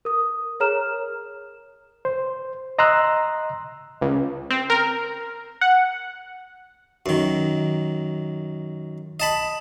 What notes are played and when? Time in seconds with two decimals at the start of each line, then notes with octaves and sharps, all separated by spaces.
0.05 A#4 D#6
0.60 G#4 A#4 C#5 A#5 F6 E7
2.05 C5
2.79 D#5 A#5 C6 E6 F#6
4.01 C#2
4.50 C4
4.70 A#4
5.61 F#5
7.06 F#2 D#3
9.20 D#5 A5 B5